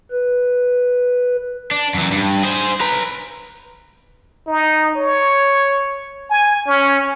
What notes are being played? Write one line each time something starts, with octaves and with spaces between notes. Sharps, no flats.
B4
D4
F#2 E3
G2
G#4 C5
B4 A#5
D#4
C#5
G#5
C#4